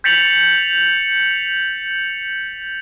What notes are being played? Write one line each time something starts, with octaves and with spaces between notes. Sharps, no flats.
G6 A6 B6 C#7 F7 F#7